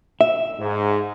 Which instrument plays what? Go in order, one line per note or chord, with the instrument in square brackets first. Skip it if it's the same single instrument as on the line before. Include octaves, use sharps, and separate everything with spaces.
[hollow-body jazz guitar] E5
[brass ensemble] G#2